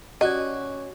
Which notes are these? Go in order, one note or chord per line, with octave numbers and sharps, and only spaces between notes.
C#4 F#4 G4 D5 D#5 F#5